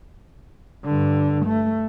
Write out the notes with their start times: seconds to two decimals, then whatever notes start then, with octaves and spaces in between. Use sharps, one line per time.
0.84 G2 D3
1.46 A3